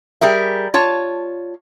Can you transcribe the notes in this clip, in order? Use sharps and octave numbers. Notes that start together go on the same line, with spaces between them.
G3 G#4 A#4 E5
F4 C#5 A5